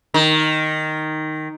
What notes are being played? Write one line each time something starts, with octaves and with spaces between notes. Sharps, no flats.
D#3